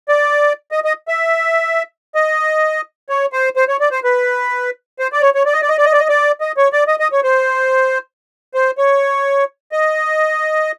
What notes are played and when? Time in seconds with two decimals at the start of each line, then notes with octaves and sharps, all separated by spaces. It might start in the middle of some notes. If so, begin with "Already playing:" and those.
0.09 D5
0.72 D#5
0.85 D#5
1.08 E5
2.15 D#5
3.09 C#5
3.33 C5
3.56 C5
3.68 C#5
3.80 D5
3.91 C5
4.04 B4
4.99 C5
5.12 D5
5.22 C#5
5.35 C#5
5.46 D5
5.53 D#5
5.62 D5
5.69 D#5
5.78 D5
5.85 D#5
5.92 D5
6.00 D#5
6.09 D5
6.41 D#5
6.57 C#5
6.73 D5
6.88 D#5
7.00 D#5
7.12 C#5
7.24 C5
8.54 C5
8.78 C#5
9.72 D#5